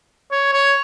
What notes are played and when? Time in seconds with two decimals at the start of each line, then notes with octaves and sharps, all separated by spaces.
0.32 C#5
0.53 C#5